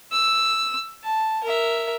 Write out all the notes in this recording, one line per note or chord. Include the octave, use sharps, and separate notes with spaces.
E6
A5
A#4 E5